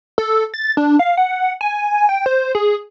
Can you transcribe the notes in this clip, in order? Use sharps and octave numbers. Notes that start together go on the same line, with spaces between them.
A4
A6
D4
F5
F#5
G#5
G5
C5
G#4